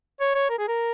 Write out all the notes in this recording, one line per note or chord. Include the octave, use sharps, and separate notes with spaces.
C#5
C#5
A#4
G#4
A#4